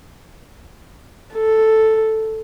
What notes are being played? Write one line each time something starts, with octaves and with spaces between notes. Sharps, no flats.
A4